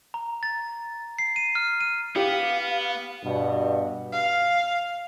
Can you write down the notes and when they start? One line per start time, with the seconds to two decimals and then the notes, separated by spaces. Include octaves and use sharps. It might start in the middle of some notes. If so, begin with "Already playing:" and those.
0.14 A#5
0.43 A6
1.19 C7
1.36 D#7
1.55 F6
1.81 D#7
2.16 B3 G4 F5
3.25 G2 B2
4.13 F5